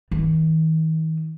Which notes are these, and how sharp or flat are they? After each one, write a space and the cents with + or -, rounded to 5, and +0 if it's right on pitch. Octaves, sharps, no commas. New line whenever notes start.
D#3 +45